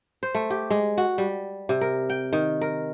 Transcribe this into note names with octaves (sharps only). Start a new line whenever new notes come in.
C5
A3
G4
G#3
F#4
G3
C3
A#4
G5
D#3
A#4